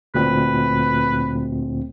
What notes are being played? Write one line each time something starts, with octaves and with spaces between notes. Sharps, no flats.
D2 A#2 C4 B4